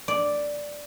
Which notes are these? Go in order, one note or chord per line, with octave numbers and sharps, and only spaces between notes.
D5